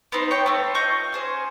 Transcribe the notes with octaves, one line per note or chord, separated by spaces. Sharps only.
B3 C4 D#4
C#5 G5
A3 C4
F4 D#5 C#6 G6
C#4 G#4 C5